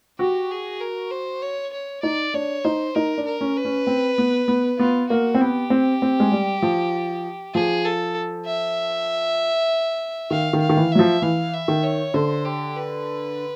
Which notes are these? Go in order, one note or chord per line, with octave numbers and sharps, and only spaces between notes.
F#4 G4
G#4
A#4
C5
C#5
C#5
D#4 D5
D4 C#5
D#4 C5
D#4 A#4
D4
A#4
C#4
B4
C#4
C4
B3
B3
B3 F4
A#3 F#4
C4
B3 G4
C4
C4
G#3
G3
F3
F3 G#4
A4
E5
D#3 F5
D#3
F5
D#3
E3
F#3 E5
F3
E3 F5
E5
D#3
C#5
D3 C5
G4
B4